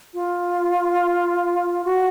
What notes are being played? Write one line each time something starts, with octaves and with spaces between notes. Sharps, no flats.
F4
F#4